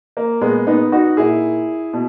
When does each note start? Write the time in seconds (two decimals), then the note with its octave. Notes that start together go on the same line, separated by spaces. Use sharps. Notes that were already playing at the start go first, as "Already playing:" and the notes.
0.17 A#3
0.41 A#2 G#3 B3
0.67 B3 D#4
0.92 D#4 F#4
1.17 A#2 E4 G#4
1.93 B2